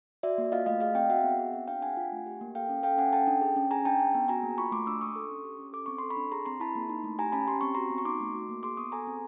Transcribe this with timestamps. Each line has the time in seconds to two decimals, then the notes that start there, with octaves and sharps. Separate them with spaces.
0.23 F#4 D5 E5
0.38 A#3
0.52 F4 D#5 F5
0.66 A3 D#5 F5
0.81 G#4 D#5 F5
0.95 C4 F5 G5
1.10 F#4 E5 F#5
1.24 B3
1.39 G#4
1.53 C4
1.68 D4 F5 G5
1.82 D4 F#5 G#5
1.97 F4
2.12 A3
2.26 G4
2.41 A#3
2.55 A4 F5 G5
2.69 C#4
2.83 A4 F5 G5
2.98 C#4 F#5 G#5
3.13 A4 G5 A5
3.27 D4
3.41 G#4
3.56 C#4
3.71 G#4 G#5 A#5
3.85 D4 G5 A5
3.99 G#4
4.14 B3
4.28 F#4 G#5 A#5
4.43 A#3
4.58 F4 B5 C#6
4.72 A3 C6 D6
4.87 D4 D6 E6
5.01 D4 C#6 D#6
5.16 A4
5.30 C#4
5.44 G4
5.59 C#4
5.73 A4 D6
5.86 C4 C#6
5.98 A4 C6
6.10 B5 C#6
6.17 D4
6.32 G#4 A#5 C6
6.46 C4 A#5 C6
6.60 E4 A5 B5
6.75 A#3
6.89 D#4
7.04 A3
7.18 G4 G#5 A#5
7.32 C#4 A5 B5
7.48 G4 C6
7.61 C4 C#6
7.75 F#4 A#5 C6
7.90 B3
7.98 C#6
8.05 D#4 C6 D6
8.20 A3
8.34 F#4
8.49 A#3
8.63 G#4 C6 D6
8.77 B3 C#6 D#6
8.92 A4 G#5 A#5
9.07 C4